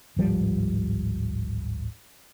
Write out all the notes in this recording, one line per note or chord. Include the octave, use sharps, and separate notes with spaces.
D1 G#1 F3 G3